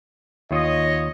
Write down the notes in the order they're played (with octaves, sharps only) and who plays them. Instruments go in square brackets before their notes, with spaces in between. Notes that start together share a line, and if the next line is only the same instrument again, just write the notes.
[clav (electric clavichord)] D#2 F4 [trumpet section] C#5 D#5